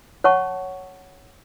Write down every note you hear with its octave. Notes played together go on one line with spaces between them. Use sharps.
C#5 F#5 A5 C#6